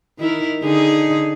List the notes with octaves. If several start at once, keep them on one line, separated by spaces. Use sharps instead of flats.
D#3 E4 A#4
D3 D#4 G#4